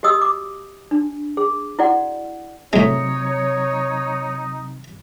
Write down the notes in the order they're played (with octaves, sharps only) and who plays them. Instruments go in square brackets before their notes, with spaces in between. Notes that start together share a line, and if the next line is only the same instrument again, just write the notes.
[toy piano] F#4 G4 D#5 D#6 E6
D6
D4
G#4
E4 F#4 D5 F#5
[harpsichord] A2 G#3 [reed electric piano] C3 F#3 C4 [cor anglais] D#4 [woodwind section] C#5